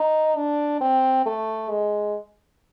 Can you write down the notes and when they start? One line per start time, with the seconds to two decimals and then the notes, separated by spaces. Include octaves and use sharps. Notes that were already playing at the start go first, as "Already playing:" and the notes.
Already playing: D#4
0.36 D4
0.81 C4
1.26 A3
1.70 G#3